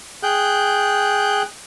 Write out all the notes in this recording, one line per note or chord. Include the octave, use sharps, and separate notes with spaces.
G#4 G5 F#6 G6